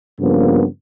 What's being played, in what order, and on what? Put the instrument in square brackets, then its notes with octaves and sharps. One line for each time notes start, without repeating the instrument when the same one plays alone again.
[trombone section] G2 C#3 F3 A#3 B3